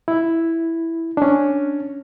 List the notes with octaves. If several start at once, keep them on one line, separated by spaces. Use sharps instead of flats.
E4
C#4 D4